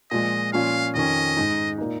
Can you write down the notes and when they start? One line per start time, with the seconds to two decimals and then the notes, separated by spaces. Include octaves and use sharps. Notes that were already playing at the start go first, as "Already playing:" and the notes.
0.11 A#2 F3 G#3 D#5
0.53 A#2 F3 C#4 F4 F5
0.95 F2 D#3 C#4 D#5
1.37 G#2 G#3 D#4
1.78 A#2 A#3 D#4